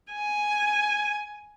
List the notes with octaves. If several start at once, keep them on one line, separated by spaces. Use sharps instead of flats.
G#5